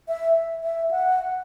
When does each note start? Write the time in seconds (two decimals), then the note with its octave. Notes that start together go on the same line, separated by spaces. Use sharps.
0.08 E5
0.63 E5
0.91 F#5